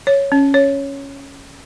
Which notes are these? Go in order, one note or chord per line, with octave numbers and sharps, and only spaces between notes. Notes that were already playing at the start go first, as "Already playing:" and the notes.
C#5
C#4
C#5